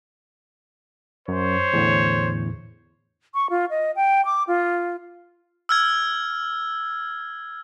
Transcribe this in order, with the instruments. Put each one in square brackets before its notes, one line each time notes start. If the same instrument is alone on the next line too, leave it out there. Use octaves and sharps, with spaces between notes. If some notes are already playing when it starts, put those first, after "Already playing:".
[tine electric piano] F#2 [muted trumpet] C5 [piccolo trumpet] C#5
[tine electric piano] E2 A2 D3
[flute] C#6
F4
D#5
G5
D6
F4
[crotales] E6 F6 G#6